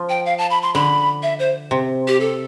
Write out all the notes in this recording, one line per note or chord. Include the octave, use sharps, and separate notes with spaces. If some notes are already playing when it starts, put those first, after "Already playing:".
Already playing: F3
G5
F5
A5
B5
C6
D3 B5
E5
C5
C3
G4
A4